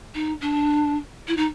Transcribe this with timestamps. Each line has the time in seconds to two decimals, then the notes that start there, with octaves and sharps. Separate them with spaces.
0.15 D#4
0.41 D4
1.28 E4
1.37 D#4